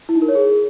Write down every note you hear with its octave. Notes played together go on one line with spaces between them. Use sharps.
E4
D#4
A#4
C#5
G#4